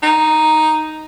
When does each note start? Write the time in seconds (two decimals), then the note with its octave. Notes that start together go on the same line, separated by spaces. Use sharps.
0.03 D#4